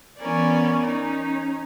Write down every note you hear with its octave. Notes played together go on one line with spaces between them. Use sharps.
E3 B3 C#4 A#4 D5
C#4 D#4